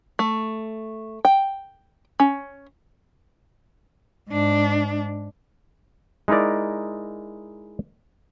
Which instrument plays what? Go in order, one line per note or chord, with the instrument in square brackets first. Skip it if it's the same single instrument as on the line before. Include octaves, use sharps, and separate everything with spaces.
[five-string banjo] A3
G5
C#4
[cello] G#2 D4
[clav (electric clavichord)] G#3 D#4 E4 A#4 D5